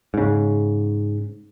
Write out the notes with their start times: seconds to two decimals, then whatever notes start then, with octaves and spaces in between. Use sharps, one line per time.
0.14 G#2 C#3